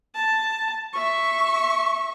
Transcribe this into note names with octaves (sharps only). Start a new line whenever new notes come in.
A5
E5 C#6